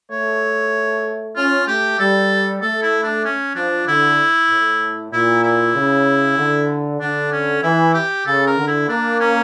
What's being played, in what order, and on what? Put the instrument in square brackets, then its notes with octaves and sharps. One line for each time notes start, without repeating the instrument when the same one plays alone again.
[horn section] A3 [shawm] C#5
[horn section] C#4 [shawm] F4
[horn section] A3 [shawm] G4
[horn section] G3 [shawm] A4
[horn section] A3 [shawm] A4
[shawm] E4
D4
C#4
[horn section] F3 [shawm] D4
[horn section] D3 [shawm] E4
[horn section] A2
[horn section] A#2 [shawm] E4
[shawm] E4
[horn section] C#3
D3
[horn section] D3 [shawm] D4
[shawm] C#4
[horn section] E3 [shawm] E4
[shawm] G4
[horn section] C#3 [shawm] A4
[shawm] A#4
[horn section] D3
[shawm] E4
[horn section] A#3 [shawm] D4
[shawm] C#4